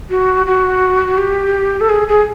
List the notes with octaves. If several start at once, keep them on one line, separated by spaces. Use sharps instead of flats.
F#4
F#4
G4
A4
G#4
G#4